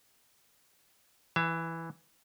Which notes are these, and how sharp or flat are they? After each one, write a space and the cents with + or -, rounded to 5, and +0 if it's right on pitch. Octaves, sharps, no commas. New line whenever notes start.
E3 +0 E5 +40